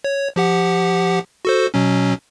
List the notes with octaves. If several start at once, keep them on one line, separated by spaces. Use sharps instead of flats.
C#5
F3 G4 F#5
F#4 A4 C5
B2 F#3 C#4